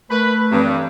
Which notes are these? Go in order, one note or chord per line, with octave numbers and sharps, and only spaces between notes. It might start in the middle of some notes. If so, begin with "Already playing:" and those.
A3 A#4 B4
G2 E3 C4